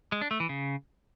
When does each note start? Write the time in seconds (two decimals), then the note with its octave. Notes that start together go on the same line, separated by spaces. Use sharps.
0.12 G#3
0.21 D4
0.31 A3
0.40 E3
0.49 C#3